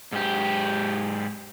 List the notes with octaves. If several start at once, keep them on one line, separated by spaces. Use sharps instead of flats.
G#2 G4